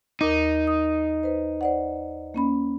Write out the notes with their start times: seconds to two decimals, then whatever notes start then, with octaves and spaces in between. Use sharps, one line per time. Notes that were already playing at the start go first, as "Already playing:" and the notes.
0.21 D#2 D#4 A#4 D6
0.67 D#6
1.23 B4 C5
1.61 C5 D5 F#5
2.34 A#3 C#4 B5